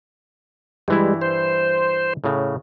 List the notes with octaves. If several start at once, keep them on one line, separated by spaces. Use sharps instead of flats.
G2 E3 G3 G#3 E4
C5
A2 C#3